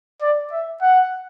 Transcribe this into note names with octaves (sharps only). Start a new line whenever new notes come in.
D5
E5
F#5